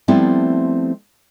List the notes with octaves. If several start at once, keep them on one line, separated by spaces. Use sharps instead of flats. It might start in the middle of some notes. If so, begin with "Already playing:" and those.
F3 G3 A3 B3 C4 E4